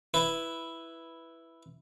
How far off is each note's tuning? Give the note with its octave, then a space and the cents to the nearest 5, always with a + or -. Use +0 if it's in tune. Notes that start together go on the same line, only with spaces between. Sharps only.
E4 +0 B4 +0